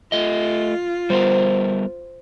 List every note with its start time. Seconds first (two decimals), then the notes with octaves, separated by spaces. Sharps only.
0.12 A3 F4 D#5
1.10 G3 B3 A#4 C5